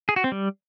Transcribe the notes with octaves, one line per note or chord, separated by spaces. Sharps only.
G#4
F#4
C4
G3